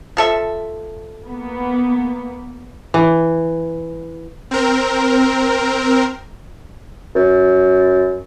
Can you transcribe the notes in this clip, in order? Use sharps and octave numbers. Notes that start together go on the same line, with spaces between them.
F3 A4 E5
A#3 B3
E3
C4 A#4
F#2